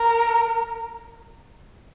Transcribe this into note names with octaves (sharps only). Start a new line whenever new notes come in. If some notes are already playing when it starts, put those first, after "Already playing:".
Already playing: A#4